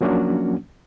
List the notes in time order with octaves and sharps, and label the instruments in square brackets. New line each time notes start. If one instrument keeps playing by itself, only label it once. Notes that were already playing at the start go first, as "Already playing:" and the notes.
[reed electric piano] F3 F#3 A#3 C#4 D4 F#4